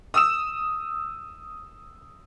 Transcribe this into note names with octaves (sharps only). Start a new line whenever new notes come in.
D#6 E6 E7